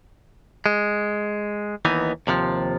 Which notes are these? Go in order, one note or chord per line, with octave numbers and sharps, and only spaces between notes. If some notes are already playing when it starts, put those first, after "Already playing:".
G#3
D#2 E3 B3 D#4
D#2 C3 E3 F3